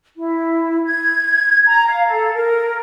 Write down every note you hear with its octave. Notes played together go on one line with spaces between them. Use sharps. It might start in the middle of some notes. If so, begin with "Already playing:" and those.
E4
G#6
A#5
F5
A4
A#4